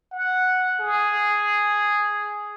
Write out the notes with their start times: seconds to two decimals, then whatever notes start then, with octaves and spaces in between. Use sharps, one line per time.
0.12 F#5
0.81 G#4